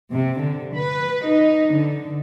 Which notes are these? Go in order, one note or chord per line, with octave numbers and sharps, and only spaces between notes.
C3
D3
B4
D#4
D3